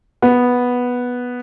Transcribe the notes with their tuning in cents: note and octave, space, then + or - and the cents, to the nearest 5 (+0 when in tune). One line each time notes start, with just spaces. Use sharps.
B3 -5